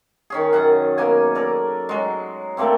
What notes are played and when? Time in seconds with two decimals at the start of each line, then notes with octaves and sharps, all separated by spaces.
0.30 D#3 C#4 G#4
0.53 F#2 F#5
0.98 B2 A#3 G#5
1.35 A4 A#4 D5
1.89 F#3 G#3
2.57 D3 A3 A#3 C4